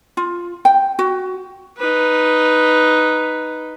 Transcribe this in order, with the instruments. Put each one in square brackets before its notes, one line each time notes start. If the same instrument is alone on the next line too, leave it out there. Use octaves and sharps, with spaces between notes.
[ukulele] F4
G5
F#4
[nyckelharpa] D#4 B4